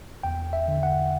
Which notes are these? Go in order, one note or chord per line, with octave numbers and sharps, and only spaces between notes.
E2 G5
E5
D3
F#5